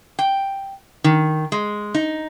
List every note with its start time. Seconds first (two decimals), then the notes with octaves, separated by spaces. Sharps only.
0.19 G5
1.04 D#3
1.52 G#3
1.95 D#4